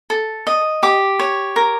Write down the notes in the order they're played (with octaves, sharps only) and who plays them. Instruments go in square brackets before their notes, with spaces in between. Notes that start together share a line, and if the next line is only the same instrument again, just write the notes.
[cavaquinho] A4
D#5
G4 D6
C#5
A#4